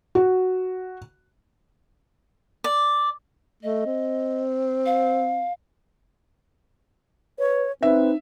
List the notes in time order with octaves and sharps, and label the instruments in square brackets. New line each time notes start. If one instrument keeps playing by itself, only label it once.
[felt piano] F#4
[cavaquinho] D5
[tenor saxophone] A3 [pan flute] D#5
[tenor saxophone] C4
[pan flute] F5
[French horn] B4 [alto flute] C#5
[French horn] C4 [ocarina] D#4 [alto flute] B4 [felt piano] E5